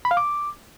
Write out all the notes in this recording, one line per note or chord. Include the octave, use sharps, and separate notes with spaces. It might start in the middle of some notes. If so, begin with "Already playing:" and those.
B5
F5
D6